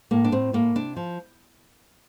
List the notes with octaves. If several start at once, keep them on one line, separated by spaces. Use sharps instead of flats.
A2 A#3
D4
A2 C4
A2 A#3
C3 D4
F3